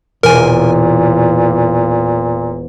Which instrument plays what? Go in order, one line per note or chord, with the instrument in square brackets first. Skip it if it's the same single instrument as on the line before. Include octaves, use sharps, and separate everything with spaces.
[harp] E1 [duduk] A#2 [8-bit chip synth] A#4 G#5